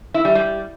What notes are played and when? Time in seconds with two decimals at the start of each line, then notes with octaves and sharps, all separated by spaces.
0.14 E4
0.25 G3
0.35 G3